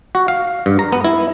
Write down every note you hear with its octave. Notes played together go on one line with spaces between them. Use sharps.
F#4
F5
G2
A#5
B3
E4